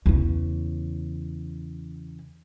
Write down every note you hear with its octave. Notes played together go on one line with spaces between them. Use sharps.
E2 C#3